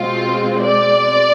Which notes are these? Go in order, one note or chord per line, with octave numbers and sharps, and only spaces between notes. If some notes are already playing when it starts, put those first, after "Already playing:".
Already playing: B2 G#3 C4 F4
D5